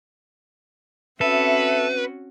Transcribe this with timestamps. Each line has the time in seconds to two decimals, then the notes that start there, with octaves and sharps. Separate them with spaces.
1.21 C4 C#4 F#4 A4 B4 E5